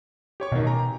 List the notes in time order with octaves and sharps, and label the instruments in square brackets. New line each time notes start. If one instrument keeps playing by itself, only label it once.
[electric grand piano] G4 C#5 C#6
[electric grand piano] A1 D#3 [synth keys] B2
[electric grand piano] G4 G#5 A#5